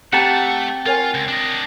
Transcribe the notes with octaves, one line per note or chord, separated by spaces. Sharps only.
A3 C4 G4 F#5 G5 A5 A#5
F4 A#4 C#5 G#5
C#2
D4 D#5